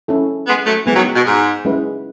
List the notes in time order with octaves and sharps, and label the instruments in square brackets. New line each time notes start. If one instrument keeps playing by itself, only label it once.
[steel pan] C#4 E4 A4
[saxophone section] G#3 B3
F#3 A3
[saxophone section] E3 [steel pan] G#3 B3 E4
[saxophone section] D#3 F#3
B2
G#2
[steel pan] G#3 C#4 E4 G#4 B4